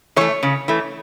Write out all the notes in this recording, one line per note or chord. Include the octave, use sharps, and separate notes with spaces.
E3 A3 C#5
C#3
E3 A3